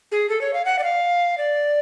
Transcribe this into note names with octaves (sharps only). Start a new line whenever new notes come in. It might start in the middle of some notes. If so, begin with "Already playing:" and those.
G#4
A4
C#5
F5
F#5
D5
F5
D5